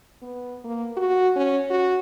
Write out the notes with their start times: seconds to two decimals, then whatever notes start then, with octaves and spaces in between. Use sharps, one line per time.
0.22 B3
0.64 A#3
0.97 F#4
1.36 C#4
1.70 F#4